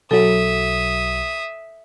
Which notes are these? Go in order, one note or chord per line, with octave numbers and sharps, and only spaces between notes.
B1 F#3 A4 E5 D#6